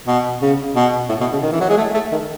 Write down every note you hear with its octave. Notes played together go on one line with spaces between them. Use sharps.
B2
C#3
B2
A2
B2
C#3
D#3
E3
F#3
G#3
A3
A3
D#3